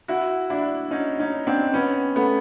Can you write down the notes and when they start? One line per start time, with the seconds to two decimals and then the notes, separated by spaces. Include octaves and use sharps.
0.08 E4 F#4
0.50 D4 E4
0.91 C#4 D#4
1.20 C#4 D#4
1.47 C4 D4
1.74 B3 C#4
2.16 A3 B3